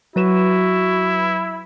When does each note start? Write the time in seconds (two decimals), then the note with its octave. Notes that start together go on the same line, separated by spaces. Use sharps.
0.16 F#3 E4 F#4 B4 E7